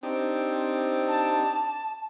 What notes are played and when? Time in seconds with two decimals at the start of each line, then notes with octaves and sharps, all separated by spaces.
0.03 C4 D4 D#4 G4
1.08 A5